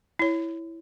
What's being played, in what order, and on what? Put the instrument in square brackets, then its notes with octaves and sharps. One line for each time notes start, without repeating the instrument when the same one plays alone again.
[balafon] E4 C#5